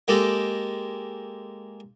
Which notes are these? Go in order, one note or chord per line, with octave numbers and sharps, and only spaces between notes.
G#3 A#3 G4 A4